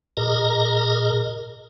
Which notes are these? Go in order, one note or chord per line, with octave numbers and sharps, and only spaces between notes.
A#2 G#4 A#4 D#5 A#5